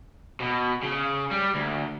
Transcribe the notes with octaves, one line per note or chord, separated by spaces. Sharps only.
B2
C#3
G3
D2